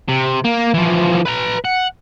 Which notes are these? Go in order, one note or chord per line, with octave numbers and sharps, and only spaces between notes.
C3
A#3
E3 F3
B4 A#5
F#5